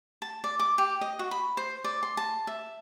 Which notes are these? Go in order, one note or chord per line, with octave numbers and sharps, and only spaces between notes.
A5
D5
D6
G4
D#5
F#4
B5
C5
D5
C6
A5
E5